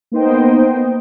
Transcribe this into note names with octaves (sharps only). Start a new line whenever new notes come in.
A#3 B3 D#4 C5 D#5 G5